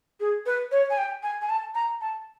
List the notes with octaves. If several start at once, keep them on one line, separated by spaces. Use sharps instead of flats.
G#4
B4
C#5
G#5
G5
G#5
G#5
A5
A#5
A5